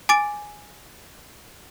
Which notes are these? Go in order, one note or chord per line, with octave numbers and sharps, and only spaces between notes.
G#5 D6 A6 D7